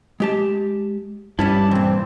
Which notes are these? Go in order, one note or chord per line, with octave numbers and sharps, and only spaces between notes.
G#3 G4 A5
G2 G3 C#4 E4 A5
A#2 E3 C4